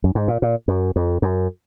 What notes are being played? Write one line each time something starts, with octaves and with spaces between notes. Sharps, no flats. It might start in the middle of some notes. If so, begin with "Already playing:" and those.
F#2
G#2
A#2
A#2
F#2
F2
F#2